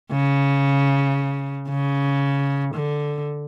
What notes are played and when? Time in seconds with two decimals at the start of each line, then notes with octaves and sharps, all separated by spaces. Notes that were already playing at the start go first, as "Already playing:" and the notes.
0.11 C#3
1.69 C#3
2.74 D3